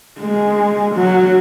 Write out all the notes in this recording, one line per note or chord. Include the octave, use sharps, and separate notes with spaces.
G#3
F#3